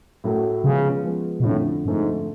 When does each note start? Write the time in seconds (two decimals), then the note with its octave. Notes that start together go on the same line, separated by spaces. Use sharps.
0.24 A2 F#3 A3
0.64 C#3 F3 G#3 B3
1.04 F3 G#3 B3
1.40 B2
1.45 F2 A2 D3 F3 A3
1.86 F2 G#2 D3 F3 A3